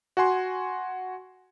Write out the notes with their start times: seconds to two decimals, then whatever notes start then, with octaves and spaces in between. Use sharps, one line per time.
0.17 F#4 F#5 G#5 C6